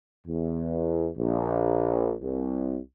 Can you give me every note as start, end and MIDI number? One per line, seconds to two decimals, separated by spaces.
0.27 1.10 40
1.18 2.16 34
2.22 2.79 36